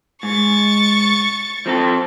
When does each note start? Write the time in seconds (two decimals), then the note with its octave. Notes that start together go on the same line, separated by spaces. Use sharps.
0.23 G#2 C#6 A6
1.66 F3 C4 A4